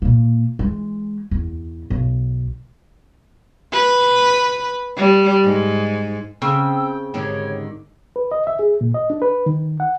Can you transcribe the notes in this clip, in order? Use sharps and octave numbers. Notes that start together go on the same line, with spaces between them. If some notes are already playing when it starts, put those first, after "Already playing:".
A#2 A#3
E3 G#3
E2
B1
B4
G3
G#2
C#3 C4 G5 E6
G#2 D3 D#3 G4 C#5
B4
D#5
E5
G#4
A#2
D#5
D4
B4
D#3
F#5